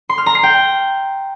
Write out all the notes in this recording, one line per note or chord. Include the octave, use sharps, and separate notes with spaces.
C6
F6
A#5
C7
G5